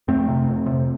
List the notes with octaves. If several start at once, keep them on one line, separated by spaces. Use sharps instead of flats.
F2 A3 C4
C3
F2
C3